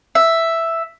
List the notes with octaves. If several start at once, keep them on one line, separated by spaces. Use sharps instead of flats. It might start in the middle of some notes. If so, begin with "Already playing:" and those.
E5